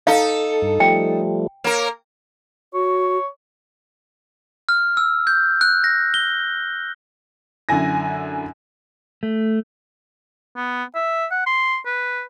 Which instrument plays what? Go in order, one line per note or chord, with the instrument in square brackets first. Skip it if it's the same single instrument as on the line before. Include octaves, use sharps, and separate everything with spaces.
[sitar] D#4 A4 [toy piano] F5
[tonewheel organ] G2
[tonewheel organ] F3 G3 A3 [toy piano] G5
[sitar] A#3 A#4 [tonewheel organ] C#5 F6
[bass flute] F#4 [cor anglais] C#5
[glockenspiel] F6
E6
G6
F#6
A#6
G7
[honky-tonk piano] F#2 D3 E4 G#5 A#6
[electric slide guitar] A3
[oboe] B3
E5
F#5
C6
B4